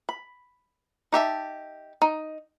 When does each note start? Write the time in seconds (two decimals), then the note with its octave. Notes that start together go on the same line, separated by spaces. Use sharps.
0.09 B5
1.12 D#4 G4 E5 A5
2.02 D#4